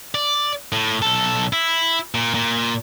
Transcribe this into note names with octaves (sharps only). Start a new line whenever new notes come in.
D5
A2
B1 A4
E4
A#2
A#2